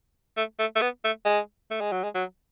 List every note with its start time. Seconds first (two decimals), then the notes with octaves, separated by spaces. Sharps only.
0.37 A3
0.59 A3
0.76 A3
0.82 B3
1.04 A3
1.26 G#3
1.71 A3
1.81 G#3
1.92 F#3
2.04 G#3
2.15 F#3